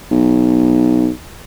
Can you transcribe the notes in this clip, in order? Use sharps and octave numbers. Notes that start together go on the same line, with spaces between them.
B1